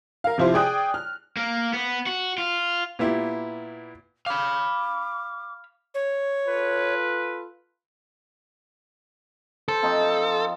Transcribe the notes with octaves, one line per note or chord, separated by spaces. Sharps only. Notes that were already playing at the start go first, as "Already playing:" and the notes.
A#4 F5
C3 F3 E4 F4 C5
G#4 D5 G5 D#6 F#6
F6
A#3
B3
F#4
F4
A#2 B3 E4 G4
F5 B5 D6
C#5
F4 A4 B4
A4 C5
F3 C4 D#4